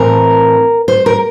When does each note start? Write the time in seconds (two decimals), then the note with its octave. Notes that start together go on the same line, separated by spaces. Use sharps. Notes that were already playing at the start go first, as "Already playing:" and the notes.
Already playing: A2 E3 A3 C4 A#4
0.88 C5
1.06 A#4